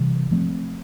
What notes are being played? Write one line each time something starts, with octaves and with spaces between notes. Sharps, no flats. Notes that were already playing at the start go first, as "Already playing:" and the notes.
Already playing: C3 E3 G3
F3 A3 C4